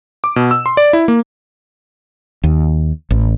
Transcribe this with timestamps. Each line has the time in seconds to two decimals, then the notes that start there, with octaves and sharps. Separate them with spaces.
0.24 D6
0.36 B2
0.51 E6
0.66 C6
0.77 D5
0.93 E4
1.08 A#3
2.44 D#2
3.11 A1